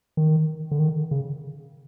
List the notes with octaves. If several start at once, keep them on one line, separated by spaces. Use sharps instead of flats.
D#3
D3
D#3
C#3